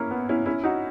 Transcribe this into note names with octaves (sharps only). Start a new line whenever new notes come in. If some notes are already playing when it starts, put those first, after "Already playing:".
Already playing: A#3 C#4 E4
B3
C#4 E4
C#4 E4
D#4 F#4